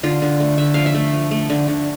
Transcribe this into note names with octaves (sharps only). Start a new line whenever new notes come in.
D3 F4
D3
A3
D3 E5
F3 F5
E5
A3
F3
A3
D3
D3